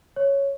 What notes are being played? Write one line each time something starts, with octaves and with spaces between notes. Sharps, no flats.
C#5